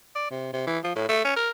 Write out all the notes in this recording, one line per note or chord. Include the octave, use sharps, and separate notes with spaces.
D5
C3
C3
E3
F3
A2
A3
C#4
A#4